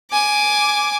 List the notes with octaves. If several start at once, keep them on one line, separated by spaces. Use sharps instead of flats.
G#5 D6